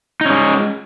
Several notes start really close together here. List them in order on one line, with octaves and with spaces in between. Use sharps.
D#4 C#4 G#3